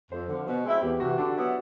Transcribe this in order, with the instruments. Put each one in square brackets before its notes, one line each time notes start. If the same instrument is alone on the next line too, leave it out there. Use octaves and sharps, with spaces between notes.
[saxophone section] F2 [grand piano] C5
[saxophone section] D3 F3
B2
G#3 C4 E4
[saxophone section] E2 [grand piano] G4
[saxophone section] C3 E3 [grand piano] F#4
[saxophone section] D3 [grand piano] D4
[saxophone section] F#3 B3 E4